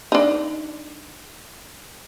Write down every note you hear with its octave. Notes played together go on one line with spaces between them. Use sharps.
D4 D#4